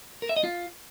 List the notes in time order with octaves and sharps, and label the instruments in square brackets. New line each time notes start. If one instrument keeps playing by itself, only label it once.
[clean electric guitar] A#4
E5
D#5
F4